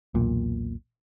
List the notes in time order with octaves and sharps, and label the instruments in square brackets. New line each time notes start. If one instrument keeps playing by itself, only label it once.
[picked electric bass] E1 B1 A#2